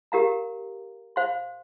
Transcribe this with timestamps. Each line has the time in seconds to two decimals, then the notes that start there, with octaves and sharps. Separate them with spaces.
0.12 G4 A#4 F5 A#5
1.16 C5 F5 C6